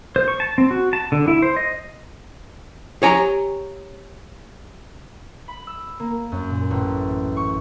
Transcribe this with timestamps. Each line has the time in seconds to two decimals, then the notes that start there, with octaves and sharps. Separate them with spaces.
0.16 C5
0.28 C#6
0.40 A5
0.58 C4
0.71 F#4
0.93 A5
1.12 D3
1.28 E4
1.42 C5
1.57 D#5
3.03 G4 C#5 G#5 A#5
5.48 B5
5.67 E6
6.00 A#3
6.32 F#2
6.50 A#2
6.71 A1
7.37 C#6